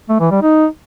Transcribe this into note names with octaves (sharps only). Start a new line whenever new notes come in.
A3
E3
G3
D#4